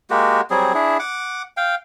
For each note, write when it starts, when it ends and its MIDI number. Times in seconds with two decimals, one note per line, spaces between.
0.10 0.41 56
0.10 0.41 58
0.10 0.41 66
0.10 0.41 67
0.50 0.73 54
0.50 0.73 55
0.50 0.73 60
0.50 0.73 68
0.74 0.98 62
0.74 0.98 64
0.74 0.98 68
0.99 1.42 78
0.99 1.42 86
1.57 1.75 77
1.57 1.75 79